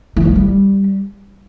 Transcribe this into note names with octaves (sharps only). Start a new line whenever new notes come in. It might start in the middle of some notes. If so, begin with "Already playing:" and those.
E3
F3
G3